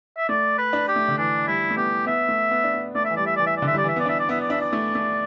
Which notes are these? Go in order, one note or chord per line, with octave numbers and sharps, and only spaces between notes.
E5
A3 D5
B4
D4
G4
A3
D3
E3 D4
G3 E4
A3
B3 G4
B3 E5
A3
B3
D4
B3
A3 D5
E5
E3
G3 D5
E5
E3 D5
E5
D5
D3
E5
G3 D5
E3 E5
B3 D5
D4 E5
D5
B3 E5
D5
D4 E5
D5
A3
A3